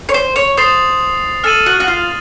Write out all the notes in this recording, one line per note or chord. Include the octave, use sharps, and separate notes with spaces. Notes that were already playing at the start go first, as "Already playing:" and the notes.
C#5
C5
C#5
C5 D#6 A6 C7 F7
A4 F6 A6 D#7 F#7
F#4
F#4
F4